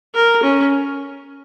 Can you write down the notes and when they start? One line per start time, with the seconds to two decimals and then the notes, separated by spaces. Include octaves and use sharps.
0.15 A#4
0.43 C#4